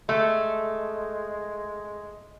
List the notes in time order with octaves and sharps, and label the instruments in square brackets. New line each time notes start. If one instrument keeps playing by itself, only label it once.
[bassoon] G#3 [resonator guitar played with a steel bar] A3